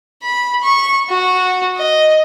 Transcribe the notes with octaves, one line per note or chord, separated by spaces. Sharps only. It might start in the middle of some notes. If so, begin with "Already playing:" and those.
B5
C#6
F#4
D#5